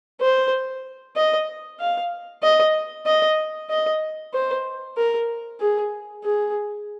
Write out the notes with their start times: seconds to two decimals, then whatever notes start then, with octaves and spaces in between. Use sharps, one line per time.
0.21 C5
1.16 D#5
1.80 F5
2.43 D#5
3.06 D#5
3.70 D#5
4.34 C5
4.97 A#4
5.60 G#4
6.24 G#4